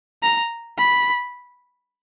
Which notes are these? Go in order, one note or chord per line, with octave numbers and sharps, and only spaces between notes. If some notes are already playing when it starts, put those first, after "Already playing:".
A#5
B5